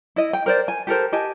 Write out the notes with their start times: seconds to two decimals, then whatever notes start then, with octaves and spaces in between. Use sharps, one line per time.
0.16 E4 D#5
0.33 G5
0.46 A#4 C5 D5
0.68 G#5
0.87 G4 A4 A#4 C5
1.12 G4 D#5 G#5 A5